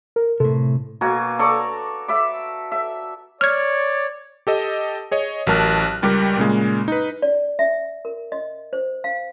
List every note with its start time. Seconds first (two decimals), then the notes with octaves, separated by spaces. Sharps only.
0.16 A#4
0.40 A2 C3 A4
1.01 B2 A#3 F#4 G#5
1.39 A4 D5 A#5 C#6
2.08 E5 B5 D6
2.72 E5
3.41 C#5 D5 F6 G#6
4.47 G4 A4 D#5
5.11 G#4 C#5 D#5
5.47 A1 F#3 A#4 A5 F6 F#6
6.03 C#2 G3 G4 A#4
6.37 A#2 C#3 G#3
6.88 D#4 B4
7.22 D5
7.59 E5
8.05 A#4
8.32 D#5
8.73 C5
9.04 F5